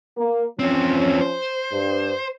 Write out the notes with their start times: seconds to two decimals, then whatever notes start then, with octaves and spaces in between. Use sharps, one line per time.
0.17 A#3
0.59 E2 F3 C4 C#4
1.21 C5
1.72 G2